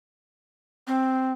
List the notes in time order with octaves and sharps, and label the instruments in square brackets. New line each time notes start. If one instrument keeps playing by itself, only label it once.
[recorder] C4